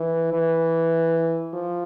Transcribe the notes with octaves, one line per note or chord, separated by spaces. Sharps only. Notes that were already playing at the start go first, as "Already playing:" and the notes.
Already playing: E3
E3
F3